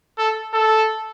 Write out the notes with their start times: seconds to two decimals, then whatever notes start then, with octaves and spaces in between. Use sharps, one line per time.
0.19 A4
0.54 A4